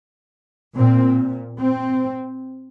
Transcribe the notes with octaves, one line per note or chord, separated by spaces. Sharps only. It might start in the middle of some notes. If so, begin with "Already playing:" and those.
A#2 C4
C4